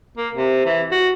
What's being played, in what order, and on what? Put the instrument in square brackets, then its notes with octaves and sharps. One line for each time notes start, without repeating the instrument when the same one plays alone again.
[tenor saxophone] A#3
C3
E3
F#4